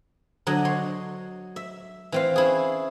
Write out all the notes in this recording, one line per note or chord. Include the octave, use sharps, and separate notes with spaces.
D3 F#3 D#5 G#5
C#5 C6
E5
E3 C4 F5
C#4 E4 G#4